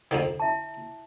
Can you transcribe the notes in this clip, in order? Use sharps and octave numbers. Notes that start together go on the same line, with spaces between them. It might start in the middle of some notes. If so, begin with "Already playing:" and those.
F2 D3 D#3
E4 E5 A5